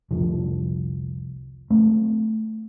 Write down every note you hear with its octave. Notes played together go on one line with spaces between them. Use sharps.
F1 C2 D3 F3
A3 C4